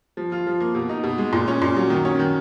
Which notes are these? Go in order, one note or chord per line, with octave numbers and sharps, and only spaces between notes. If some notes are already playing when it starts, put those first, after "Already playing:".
F3
F4
F3
A#3
B2
D#4
B2
G#3
A#2
C#4
A#2
F#3
D#3
C#4
D#3